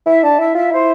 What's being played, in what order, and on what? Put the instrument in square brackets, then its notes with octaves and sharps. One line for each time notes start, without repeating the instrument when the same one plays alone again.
[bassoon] E4 [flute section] E5
[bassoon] D4 [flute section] A5
[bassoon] E4 [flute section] E5
[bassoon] F4 [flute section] E5
[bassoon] E4 [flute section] C5